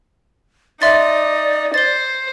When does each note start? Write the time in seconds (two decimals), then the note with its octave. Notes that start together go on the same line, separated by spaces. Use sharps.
0.82 D#4 D5 E5 C6 A6
1.74 C5 A6 G7